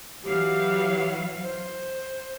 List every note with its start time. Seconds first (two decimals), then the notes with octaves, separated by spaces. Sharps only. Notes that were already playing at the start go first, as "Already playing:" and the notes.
0.24 E3 F#3 G4 F5
1.43 C5